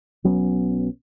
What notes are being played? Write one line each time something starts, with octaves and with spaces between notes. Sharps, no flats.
B1 F#3 B3 C#4